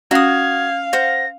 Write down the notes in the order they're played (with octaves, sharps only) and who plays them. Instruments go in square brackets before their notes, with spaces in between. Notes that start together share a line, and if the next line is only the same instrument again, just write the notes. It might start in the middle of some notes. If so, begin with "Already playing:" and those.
[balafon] C#4 [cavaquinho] F#4 D#6 [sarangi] F5 [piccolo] G#6
[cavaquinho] C5 F#5 [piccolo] A#6